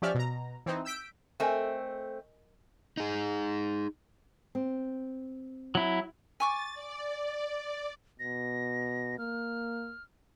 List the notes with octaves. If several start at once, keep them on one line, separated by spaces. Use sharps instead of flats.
F3 C#4 G4 D5 E5 F6
B2 A#5
E3 C4 D#4
E6 G6 B6 D7
A3 C4 A#4 D#5 G#5
D#4 G#4
C4
F#3 E4
G#5 C#6 D6 A6
D5
B2 A#6
A#3 F6